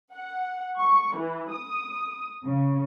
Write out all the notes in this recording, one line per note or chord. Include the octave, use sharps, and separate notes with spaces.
F#5
C#6
E3
D#6
C#3